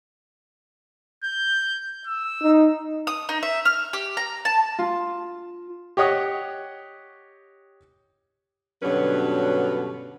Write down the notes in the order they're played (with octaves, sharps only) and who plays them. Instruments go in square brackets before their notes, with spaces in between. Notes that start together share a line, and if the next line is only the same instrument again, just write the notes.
[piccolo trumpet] G6
E6
[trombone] D#4
[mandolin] D#6
D#4
E5
F6
G4
A#5
A5
[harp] F4
[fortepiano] G4 C#5 D#5 F#5 D#6
[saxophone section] G2 B2 D3 F#3 C#4 B4